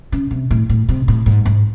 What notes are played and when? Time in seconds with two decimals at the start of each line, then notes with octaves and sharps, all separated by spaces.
0.12 C#3
0.31 C3
0.51 A2
0.69 A2
0.89 C3
1.08 A2
1.26 G#2
1.45 G#2